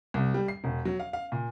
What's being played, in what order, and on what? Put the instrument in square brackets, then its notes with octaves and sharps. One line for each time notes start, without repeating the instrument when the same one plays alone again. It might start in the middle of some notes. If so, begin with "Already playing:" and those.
[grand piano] C2
G3
C7
E1
F#3
F5
F5
A#2